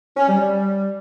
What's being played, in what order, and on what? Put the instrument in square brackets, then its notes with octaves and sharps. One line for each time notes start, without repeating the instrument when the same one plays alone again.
[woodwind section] C#4
G3
G3